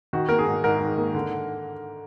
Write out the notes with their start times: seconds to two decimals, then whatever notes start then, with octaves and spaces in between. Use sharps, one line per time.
0.13 D#3 F#4
0.29 A#3 A#4
0.39 G#4
0.47 G#2
0.64 G#2 A#4
0.81 D#3
0.98 A#3
1.15 D3